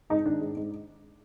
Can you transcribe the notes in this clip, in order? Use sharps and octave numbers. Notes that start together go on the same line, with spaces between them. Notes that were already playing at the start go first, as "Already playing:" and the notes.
G#2 D#4
D#3 D4
G#2
G#2